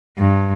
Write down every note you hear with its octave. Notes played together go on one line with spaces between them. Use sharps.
G2